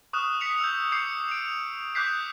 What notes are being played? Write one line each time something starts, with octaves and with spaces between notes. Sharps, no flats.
C#6 D#6 F6 F#6 E7
B6 C#7 F7
E6 G6
D6 G6 C7 C#7
D7 F7
D6 D#6 F#6 G6 B6 C7